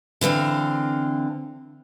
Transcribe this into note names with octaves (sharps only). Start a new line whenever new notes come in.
D3 E3 C4 F5